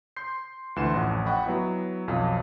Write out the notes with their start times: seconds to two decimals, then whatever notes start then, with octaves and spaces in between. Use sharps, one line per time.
0.16 C6 G6 C7
0.76 D2 E3 D4 C6 E7
0.94 A1 F2 F#5
1.26 D#5 F#5 G5 B5 C#6
1.46 F#3 B3 E4
2.07 B1 F2 F5